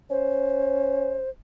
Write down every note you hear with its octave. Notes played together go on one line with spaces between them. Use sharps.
C#4 C5